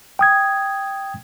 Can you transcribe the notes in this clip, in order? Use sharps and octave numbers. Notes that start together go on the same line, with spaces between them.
G5 D#6 G#6